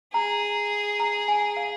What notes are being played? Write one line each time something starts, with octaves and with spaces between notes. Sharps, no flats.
G#4 A#5
A#5
G#5
F5